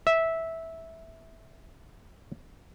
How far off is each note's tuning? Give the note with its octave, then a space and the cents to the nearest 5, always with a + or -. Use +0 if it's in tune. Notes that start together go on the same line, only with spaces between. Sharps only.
E5 -10